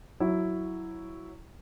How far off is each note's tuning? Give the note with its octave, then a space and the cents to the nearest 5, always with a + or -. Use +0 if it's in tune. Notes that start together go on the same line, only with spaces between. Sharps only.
F#3 +0 E4 +0